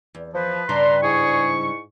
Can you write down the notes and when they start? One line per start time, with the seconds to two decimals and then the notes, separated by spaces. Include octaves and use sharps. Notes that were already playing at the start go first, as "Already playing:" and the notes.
0.15 E2
0.34 F3 B4
0.69 G2 C#3 D4 D5 A#5 C6
1.03 G#2 E4 G#4 C#6